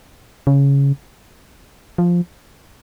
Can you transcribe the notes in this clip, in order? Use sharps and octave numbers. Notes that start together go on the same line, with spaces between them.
C#3
F3